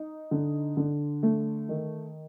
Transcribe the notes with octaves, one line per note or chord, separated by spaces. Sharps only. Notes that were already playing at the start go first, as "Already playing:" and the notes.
Already playing: D#4
D3
D3
A3
D#3